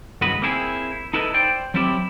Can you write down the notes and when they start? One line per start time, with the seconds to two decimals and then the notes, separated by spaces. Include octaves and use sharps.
0.21 C#2 G2 D#3 G#3 F#4 B4
0.42 A#3 C4 E4 G#4
1.14 D#4 E4 A4 B4 C5 D#5
1.34 C5 D5 G5
1.74 F#3 G3 C4 E4 F4 G4